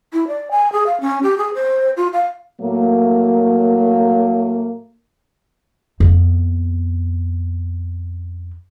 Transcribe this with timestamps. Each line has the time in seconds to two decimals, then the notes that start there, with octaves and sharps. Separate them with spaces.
0.13 E4
0.28 D5
0.51 G#5
0.72 G#4
0.86 F5
1.01 C#4
1.23 G4
1.38 G#4
1.54 C5
1.97 F4
2.13 F5
2.61 A2 F#3 A3 A#3
6.00 F2 B3